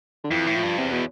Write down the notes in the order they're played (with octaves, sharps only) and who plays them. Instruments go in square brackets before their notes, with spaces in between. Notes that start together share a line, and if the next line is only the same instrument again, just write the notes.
[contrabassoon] D3
[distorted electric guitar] F2 [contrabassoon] E3
[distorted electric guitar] A2
[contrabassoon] F3
[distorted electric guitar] G2
[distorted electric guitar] E2 [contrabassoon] C3
[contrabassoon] B2